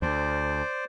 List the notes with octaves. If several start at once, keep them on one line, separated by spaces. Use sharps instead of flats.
D2 C5 D5